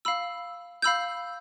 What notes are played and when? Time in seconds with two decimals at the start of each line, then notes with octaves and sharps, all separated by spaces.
0.05 F5 B5 E6
0.82 F5 B5 E6 G6